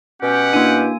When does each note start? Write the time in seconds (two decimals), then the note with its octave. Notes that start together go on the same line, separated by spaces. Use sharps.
0.22 B2 C#4 G4 F#5
0.53 A#3 D4 E4 F#4 G#5